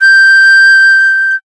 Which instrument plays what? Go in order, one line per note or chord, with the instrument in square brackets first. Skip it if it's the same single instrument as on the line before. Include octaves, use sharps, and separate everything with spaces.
[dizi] G6